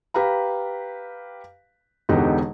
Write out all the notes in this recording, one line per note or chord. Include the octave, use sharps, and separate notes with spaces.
G4 B4 F5 A#5
E1 B2 D3 D#4 G4